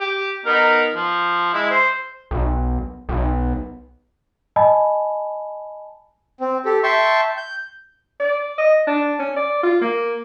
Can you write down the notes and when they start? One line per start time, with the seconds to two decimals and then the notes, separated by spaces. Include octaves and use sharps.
0.01 G4
0.45 B3 D#4 A#4
0.95 F3
1.54 G#3 E4
1.71 C5
2.31 B1
3.09 B1
4.56 D#5 G#5 A5 B5
6.40 C4
6.65 G4 A4
6.83 E5 G5 A5 C6 C#6
7.37 G6
8.20 D5
8.58 D#5
8.87 D4
9.19 C#4
9.37 D5
9.63 F4
9.81 A#3